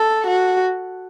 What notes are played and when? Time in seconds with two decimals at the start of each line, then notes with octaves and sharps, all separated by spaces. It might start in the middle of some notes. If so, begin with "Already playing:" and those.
Already playing: A4
0.27 F#4